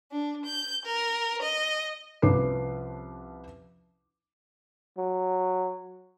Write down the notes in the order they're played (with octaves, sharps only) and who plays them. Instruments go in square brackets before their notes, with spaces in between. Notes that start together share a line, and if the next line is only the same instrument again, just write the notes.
[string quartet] D4
G6
A#4
D#5
[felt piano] C2 F3 C#4 B4 D6 C7
[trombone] F#3